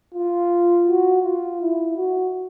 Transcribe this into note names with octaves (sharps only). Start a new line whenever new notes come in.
F4
F#4
F4
E4
F#4